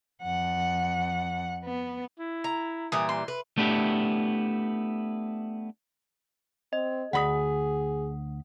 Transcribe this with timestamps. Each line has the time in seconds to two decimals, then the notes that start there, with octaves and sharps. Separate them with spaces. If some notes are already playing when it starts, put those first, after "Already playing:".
0.23 F2 F#5
1.65 B3
2.19 E4
2.44 A#5
2.92 A#2 E3 G3 D#6
3.09 C6
3.28 B4
3.58 A3 B3 D4 E4 G4
6.73 C4 D#5
7.13 D2 G#4 F#5 B5 D#6